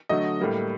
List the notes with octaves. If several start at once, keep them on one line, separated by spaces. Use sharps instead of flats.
D3 F#3 A3 D#5
A2 G3 A#3